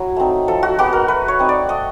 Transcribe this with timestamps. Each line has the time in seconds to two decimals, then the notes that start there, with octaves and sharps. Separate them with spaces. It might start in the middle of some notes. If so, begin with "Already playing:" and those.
Already playing: F#3 E4
0.16 A3 C4 D#4
0.48 F3 A4
0.63 F#4
0.79 G#3 B3 F#4
0.93 A#4
1.08 A3 B4
1.28 C#5
1.39 C4 D#4
1.49 D5
1.69 A3 D#5